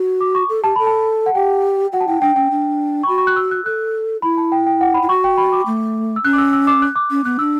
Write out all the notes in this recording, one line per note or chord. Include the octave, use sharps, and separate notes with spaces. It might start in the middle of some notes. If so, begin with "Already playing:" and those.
Already playing: F#4
D6
C#6
A4
G4 A5
A4 B5
A5
F#5
G4 G5
F#4 F#5
A5
E4 G5
D4 G5
C#4 G5
D4
C#6
F#4 B5
C#6
F#6
E6
F#6
A4 F#6
E4 B5
A5
G5
G5
F#5
B5
E4
F#4 C#6
G5
B5
D6
A3
E6
C#4 F#6
D6
E6
E6
D6
F#6
D6
C#4
B3 F#6
D4 E6